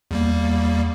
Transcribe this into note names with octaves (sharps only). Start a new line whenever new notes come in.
E2 G3 A#3